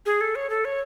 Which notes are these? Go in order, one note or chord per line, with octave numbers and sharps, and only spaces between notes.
G#4
A4
C#5
A4
C#5